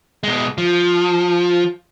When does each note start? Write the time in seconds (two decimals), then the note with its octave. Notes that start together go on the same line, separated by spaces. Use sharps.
0.23 B2 G#3
0.58 F3